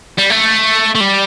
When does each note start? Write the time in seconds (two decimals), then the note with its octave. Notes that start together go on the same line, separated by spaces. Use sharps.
0.18 G3
0.31 A3
0.95 A3
1.00 G3